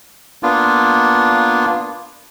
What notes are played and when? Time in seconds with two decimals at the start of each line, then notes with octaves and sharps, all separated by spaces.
0.43 A#3 B3 D4 F4